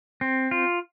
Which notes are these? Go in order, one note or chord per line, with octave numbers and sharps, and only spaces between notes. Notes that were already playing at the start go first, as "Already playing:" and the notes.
C4
F4